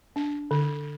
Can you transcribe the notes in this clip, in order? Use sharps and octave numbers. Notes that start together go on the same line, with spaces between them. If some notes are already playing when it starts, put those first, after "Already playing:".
D4
D3